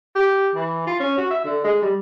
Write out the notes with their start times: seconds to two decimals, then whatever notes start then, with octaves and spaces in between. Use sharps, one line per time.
0.15 G4
0.55 E3
0.87 F4
1.00 C#4
1.18 F#4
1.31 E5
1.44 D3
1.64 G#3
1.82 G3